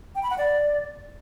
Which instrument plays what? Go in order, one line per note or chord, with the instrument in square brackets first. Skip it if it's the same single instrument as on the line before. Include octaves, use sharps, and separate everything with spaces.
[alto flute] G5
B5
F#5
D5